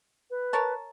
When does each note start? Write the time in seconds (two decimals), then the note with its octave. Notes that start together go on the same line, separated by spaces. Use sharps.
0.31 B4
0.53 A#4 C#5 A5